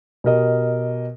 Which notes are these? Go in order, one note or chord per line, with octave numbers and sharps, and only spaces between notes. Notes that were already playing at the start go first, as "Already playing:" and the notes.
B2 G4 A#4 D#5